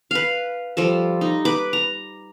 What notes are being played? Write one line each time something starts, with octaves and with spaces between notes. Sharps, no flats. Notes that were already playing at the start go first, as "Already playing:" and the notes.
B4 F5
F3 G3 A4
D#4
B4 D6
A#5